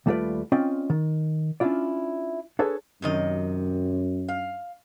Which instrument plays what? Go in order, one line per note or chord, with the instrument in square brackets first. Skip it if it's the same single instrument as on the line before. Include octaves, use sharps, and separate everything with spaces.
[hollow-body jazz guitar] D#2 G3 A3 F4 B4 D5
C4 C#4 F4 D5 D#5 G5
D#3
C#4 D4 E4 F4 D5
D4 G#4 A4 B4 C#5
[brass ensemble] F#2 [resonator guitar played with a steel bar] C3 D#3 D#5
[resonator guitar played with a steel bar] F5